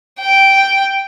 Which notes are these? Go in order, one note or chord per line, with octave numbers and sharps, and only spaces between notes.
G5